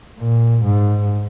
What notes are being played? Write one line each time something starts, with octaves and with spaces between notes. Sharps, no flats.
A#2
G#2